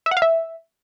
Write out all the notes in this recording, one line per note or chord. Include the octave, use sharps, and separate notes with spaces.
E5
F#5
F5
E5